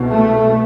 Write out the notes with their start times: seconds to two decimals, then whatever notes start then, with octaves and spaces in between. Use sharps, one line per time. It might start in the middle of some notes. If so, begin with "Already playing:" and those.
Already playing: C2 B2
0.09 A3